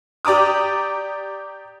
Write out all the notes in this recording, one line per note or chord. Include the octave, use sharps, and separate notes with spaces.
G4 D5 A#5 D6 D#6